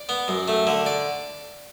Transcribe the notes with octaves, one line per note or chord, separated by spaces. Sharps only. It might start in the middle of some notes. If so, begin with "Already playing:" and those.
Already playing: D5
B3
F#2
A3
D3
D5